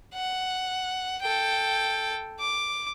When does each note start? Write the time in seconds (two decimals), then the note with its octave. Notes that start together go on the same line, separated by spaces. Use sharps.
0.14 F#5
1.21 A4 G5
2.40 D6